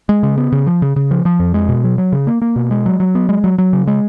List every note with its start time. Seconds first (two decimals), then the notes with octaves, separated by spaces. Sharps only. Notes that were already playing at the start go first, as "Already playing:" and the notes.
0.09 G#3
0.23 C#3
0.38 B3
0.52 C#3
0.67 F3
0.82 C#3
0.96 C#3
1.11 F3
1.25 F3
1.40 F2
1.54 G#3
1.69 B2
1.84 F#3
1.98 F#3
2.13 C#3
2.27 A#3
2.42 A#3
2.56 B2
2.71 G#3
2.86 F#3
3.00 F#3
3.15 B3
3.29 G#3
3.44 F#3
3.58 F#3
3.73 C#3
3.87 G#3